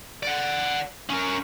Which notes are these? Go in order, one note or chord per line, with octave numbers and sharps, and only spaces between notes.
D5 F#5
C#4 A#4